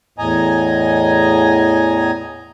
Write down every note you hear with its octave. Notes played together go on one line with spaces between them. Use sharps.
E2 A2 D#5 G#5 A#5